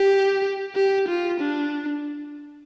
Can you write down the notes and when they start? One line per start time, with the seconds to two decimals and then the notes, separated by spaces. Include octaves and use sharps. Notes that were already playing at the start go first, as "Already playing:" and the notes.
Already playing: G4
0.75 G4
1.08 F4
1.40 D4